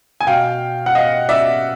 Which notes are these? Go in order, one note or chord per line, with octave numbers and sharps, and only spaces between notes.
G#5
B2 F5 G5
F#5
D#5 F5
D5 E5